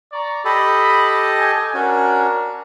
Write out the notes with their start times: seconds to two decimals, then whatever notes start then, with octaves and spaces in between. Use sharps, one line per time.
0.11 D5 A#5 C#6
0.45 G4 A4 D#5 B5
1.38 G5 G#5
1.74 C#4 D4 F#4 A#4